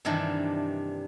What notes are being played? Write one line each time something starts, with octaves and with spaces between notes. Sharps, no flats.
G2 C3 D#3 E3 D4